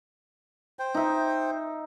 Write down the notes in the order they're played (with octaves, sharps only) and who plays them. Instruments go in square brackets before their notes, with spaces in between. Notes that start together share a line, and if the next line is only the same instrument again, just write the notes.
[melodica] C5 G5
[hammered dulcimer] D#4 E5